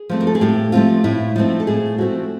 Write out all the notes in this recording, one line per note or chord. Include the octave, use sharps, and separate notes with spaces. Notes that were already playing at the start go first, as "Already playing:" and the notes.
Already playing: G#4
F3 A3 C4
A#4
A4
G#4
A2 G4
F3 A3 C4 F4
A2 E4
F3 A3 C4 D#4
A4
A2 G#4
F3 A3 C4 F#4